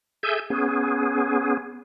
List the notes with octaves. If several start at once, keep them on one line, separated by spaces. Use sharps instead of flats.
G#4 A4 E5 G#5 G6
B3 C#4 G#4